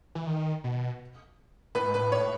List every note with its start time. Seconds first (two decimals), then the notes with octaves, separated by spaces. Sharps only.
0.15 E3
0.27 D#3
0.64 B2
1.75 A2 B4
1.86 G#2
1.94 A2 B4
2.12 C#5